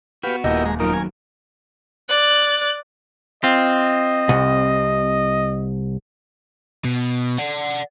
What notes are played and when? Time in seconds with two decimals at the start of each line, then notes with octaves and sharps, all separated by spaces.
0.23 B3 F#4 G4 B4 F5
0.44 D#1 E4 G4 A#4 D#5
0.65 G#3 A#5
0.80 F#2 D#3 F#3 D#4 F4 A#4
0.94 G#5
2.09 D5 F#6
3.44 C4 F4 D#5
4.29 C2
6.85 B2
7.38 D5 F#5